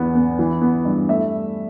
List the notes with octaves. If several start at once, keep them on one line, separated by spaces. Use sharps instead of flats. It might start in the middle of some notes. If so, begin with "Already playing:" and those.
Already playing: E2 B3
B3
E3
B3
G2
A3 E5